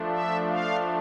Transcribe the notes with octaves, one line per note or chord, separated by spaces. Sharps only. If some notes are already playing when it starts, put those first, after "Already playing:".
Already playing: F3 A3 D4
E5
F5